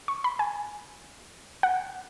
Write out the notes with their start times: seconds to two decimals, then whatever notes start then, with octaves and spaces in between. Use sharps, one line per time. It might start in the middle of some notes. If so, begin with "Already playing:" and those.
0.08 C#6
0.24 B5
0.39 G#5
1.63 F#5